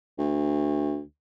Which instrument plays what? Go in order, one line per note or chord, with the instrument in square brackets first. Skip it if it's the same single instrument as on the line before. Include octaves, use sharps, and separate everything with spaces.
[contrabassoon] D2